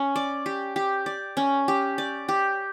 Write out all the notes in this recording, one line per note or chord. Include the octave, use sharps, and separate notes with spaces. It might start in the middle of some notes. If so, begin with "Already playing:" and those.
Already playing: C#4
D5
G4
G4
D5
C#4
G4
D5
G4